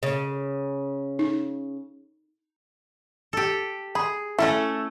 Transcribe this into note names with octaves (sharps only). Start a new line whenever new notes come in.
C#3
D#4
G4 A4
G#4 B5
A3 C#4 E4 A4